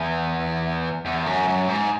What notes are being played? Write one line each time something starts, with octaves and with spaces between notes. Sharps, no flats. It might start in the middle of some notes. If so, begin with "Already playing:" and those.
Already playing: E2
E2
F#2
F#2
G#2